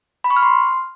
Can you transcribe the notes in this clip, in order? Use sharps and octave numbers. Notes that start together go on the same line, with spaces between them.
B5
C#6
F6
C6